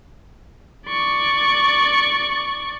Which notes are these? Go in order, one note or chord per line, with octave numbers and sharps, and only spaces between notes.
D5 C#6